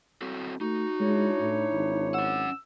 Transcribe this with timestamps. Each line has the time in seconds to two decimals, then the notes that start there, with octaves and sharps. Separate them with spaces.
0.22 C4 F#4 A4
0.61 A3 D#4 F#4
1.00 G#3 D4 E4 C#5
1.40 A2
1.73 G#1
2.14 C#4 F#5 E6